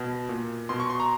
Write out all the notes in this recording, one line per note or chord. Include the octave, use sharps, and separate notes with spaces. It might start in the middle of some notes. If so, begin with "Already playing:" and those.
Already playing: B2
A#2
B2 C6
C#6
C6
A#5